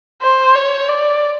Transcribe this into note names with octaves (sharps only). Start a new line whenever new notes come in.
C5
C#5
D5